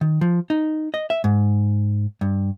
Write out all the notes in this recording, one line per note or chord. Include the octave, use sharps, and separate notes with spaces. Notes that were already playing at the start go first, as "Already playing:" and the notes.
D#3
F3
D#4
D#5
E5
G#2
G2